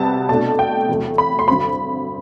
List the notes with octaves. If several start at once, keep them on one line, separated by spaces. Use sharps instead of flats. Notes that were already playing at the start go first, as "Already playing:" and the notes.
Already playing: C3 G3 B3 A5
B2 A3 D4 A5
G5
E2 C3 F#3 A3
B5
C6
G2 D3 F#3 C4 B5